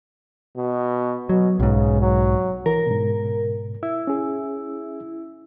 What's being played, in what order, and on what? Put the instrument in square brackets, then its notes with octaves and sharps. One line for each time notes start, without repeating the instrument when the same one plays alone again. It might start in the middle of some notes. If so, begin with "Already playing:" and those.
[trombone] B2
[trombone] B2 [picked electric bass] F#3
[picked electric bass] B1 G#2 [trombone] C#3
[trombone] F#3
[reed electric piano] E3 [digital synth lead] A#4
[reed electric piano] G#2 B2
[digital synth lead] E4
[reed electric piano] C#4 G#4